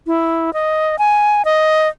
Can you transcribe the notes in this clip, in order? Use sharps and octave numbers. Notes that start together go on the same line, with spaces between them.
E4
D#5
G#5
D#5